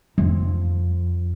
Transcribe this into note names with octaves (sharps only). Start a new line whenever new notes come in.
F2